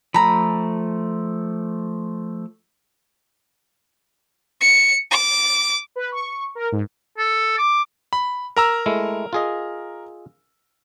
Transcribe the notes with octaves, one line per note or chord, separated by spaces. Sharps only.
F3 A3 A#5 B5
C#7
D6
B4
C#6
A#4
G#2
A4
D6
B5
A#4 A#5 E6
G#3 A3 E4
F4 G#4 D#5